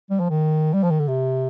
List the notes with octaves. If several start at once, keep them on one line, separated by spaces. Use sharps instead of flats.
G3
F3
D#3
G3
F3
D#3
D3
C3